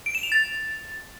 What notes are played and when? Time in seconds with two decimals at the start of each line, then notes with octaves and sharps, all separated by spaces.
0.06 D7
0.15 E7
0.23 F7
0.32 A6